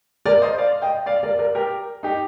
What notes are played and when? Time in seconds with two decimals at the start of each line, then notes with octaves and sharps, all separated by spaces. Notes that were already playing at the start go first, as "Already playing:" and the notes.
0.25 A#4 D5
0.42 C5 D#5
0.58 D5 F5
0.82 D#5 G5
1.06 D5 F5
1.23 A#4 D5
1.39 A#4 D5
1.55 G4 A#4
2.03 D#4 G4